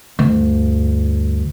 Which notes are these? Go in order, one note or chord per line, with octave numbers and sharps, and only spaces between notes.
D2 G2